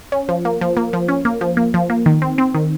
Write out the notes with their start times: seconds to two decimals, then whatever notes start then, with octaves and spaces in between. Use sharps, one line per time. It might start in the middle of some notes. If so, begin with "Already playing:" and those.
0.12 C#4
0.29 F3
0.45 A#3
0.61 F3
0.77 A#3
0.93 F3
1.08 C#4
1.25 A#3
1.41 F3
1.57 A#3
1.74 F3
1.90 A#3
2.06 D#3
2.22 C4
2.38 C4
2.55 D#3